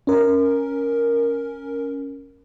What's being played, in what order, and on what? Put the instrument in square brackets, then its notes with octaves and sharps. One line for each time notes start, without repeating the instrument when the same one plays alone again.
[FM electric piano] C#4 A#4